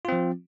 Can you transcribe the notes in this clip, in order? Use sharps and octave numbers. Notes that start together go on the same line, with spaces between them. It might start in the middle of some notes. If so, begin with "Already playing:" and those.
F3 C4 F4